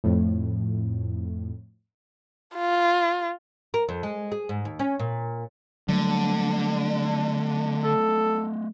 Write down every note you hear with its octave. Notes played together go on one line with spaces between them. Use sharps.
F2 A2
F4
A#4
F2
G#3
G#4
G#2
D#2
C#4
A#2
D3 F#3 G3 A3
A4